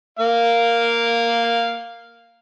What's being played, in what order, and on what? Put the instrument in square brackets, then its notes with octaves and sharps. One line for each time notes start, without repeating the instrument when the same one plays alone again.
[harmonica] A#3 F5